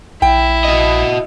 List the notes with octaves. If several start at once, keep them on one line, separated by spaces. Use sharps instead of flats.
A#1 E4 G5
F#4 D#5